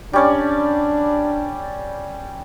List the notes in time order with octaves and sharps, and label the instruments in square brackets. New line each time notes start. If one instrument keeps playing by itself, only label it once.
[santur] G3 C#4 D5 [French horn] D4